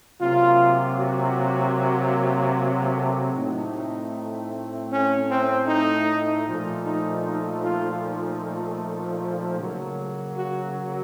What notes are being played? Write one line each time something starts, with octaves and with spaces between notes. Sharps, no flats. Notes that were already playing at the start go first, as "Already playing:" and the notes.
C3 F#3 A#3 F4
F#4
F#4
A4
A2 A3 C4 D#4
C#4
C4
D#4
A#2 F3 A3
D#4
D#4
F4
D#4
C#3 F#3 A#3
F#4